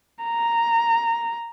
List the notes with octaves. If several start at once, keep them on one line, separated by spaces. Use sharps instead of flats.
A#5